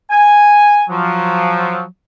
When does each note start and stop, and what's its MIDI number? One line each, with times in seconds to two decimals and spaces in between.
0.11 0.83 80
0.90 1.84 53
0.90 1.84 54